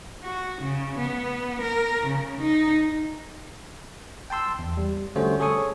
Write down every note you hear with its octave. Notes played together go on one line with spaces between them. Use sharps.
F#4
C#3
B3
A#4
C#3
D#4
G5 A5 C6 E6
E2
G3
D3 G3 A3 C#4 F#4 C5
G#4 A4 C#5 C#6 D#6